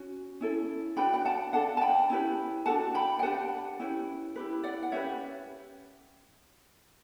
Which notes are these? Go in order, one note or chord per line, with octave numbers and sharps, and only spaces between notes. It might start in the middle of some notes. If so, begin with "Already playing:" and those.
Already playing: C#4 F#4
C#4 E4 A4
D4 F#4 B4 G5 B5
G5
F#5 A5
D4 A4 F#5 A5
A5
G5 B5
C#4 E4 G4 B4
D4 F#4 A4 F#5 A5
G5 B5
G5
D4 G4 B4 F#5 A5
C#4 E4 G4 B4
E4 G4 B4
D5 F#5
F#5
C#4 G4 B4 C#5 E5